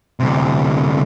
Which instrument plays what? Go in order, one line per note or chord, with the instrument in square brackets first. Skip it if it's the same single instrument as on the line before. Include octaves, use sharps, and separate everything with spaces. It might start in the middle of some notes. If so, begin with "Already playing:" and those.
[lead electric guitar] D2 C3